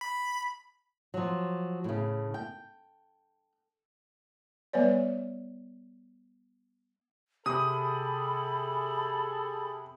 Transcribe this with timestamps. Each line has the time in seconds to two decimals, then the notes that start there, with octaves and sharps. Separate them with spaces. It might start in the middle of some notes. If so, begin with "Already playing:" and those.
0.01 B5
1.14 F3 F#3
1.84 A2 C#3
2.34 G5
4.73 G3 B3 B4 C#5 D5
7.46 C3 G#4 A4 B5 D#6